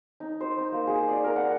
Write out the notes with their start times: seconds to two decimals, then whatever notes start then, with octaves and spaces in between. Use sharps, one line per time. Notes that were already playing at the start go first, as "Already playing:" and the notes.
0.20 D#4
0.41 C5
0.58 C6
0.72 A#3
0.87 G#4
1.08 D5
1.24 A#4
1.36 F#5